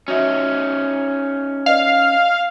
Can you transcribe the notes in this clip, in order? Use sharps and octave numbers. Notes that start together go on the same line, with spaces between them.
C#4 D#4 F#4 E5
B4 D5 D#5 F5